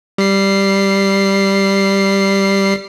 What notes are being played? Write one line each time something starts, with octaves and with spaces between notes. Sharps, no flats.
G3 C7